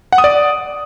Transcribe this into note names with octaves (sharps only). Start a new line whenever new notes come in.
F#5
D#6
D5